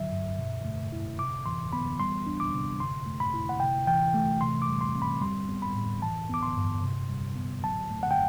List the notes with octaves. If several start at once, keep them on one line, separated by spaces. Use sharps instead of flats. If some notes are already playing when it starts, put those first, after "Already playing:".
Already playing: D3 F#3 E5
G2
B2
A3
E4
C3 D6
E3 C6
B3 B5
G3 C6
D4
D6
C3
D3 C6
A3
B5
E4
F#5
C3 G5
E3 G5
A3
C3 C6
D6
G3
C6
C4
B5
G3 C6
B3
B5
A2
E3 A5
B3 D6
C6
G2
C3
G3
B3
F#3 A5
A3
F#5
G5